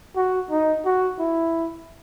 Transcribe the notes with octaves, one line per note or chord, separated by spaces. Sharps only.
F#4
D#4
F#4
E4